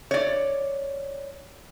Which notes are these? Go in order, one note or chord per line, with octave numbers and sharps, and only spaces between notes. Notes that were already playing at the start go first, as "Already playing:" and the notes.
C#5 D5